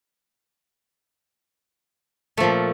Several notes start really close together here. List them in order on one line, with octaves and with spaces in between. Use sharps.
A3 F3 A#2